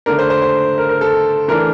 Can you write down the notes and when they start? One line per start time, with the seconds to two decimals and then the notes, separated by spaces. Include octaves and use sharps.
0.06 D3 A3 D4 A#4
0.19 C5
0.30 C5
0.42 C5
0.78 A#4
0.89 A#4
1.01 A4
1.48 E3 A3 D4 A#4